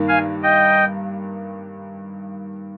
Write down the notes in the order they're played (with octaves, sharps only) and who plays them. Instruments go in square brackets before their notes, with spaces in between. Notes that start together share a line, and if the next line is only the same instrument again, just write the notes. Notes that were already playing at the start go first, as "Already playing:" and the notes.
Already playing: [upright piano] G2 D#3 A#3
[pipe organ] F5 G#5
D#5 G5